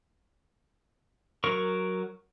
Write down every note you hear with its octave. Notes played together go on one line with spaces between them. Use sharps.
F#3 A#4 C#6